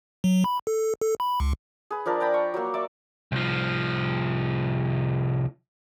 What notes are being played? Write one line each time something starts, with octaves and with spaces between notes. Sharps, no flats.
F#3
B5
A4
A4
B5
C#2
G#4 B4
F3 D4 A#4 B4
D5 G5 A#5 B5
C#6
F#3 A#3
D5 E5 C#6 D6
C2 F3